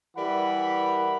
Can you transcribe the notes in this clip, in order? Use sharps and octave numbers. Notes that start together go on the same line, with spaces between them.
E3 G3 A#4 F#5 B5